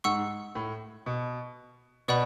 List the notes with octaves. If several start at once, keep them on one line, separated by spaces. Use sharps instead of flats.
G#2 F#5 C#6 E6
A2
B2
B2 B4 D5 F#5 B5